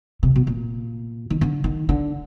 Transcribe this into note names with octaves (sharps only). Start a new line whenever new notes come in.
C3
B2
A#2
D#3
D3
D#3
D3